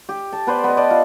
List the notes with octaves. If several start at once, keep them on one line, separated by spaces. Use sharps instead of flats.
G4
A5
B3 B4 C5 D5
B3 D#5
D5 D#5 A5
F4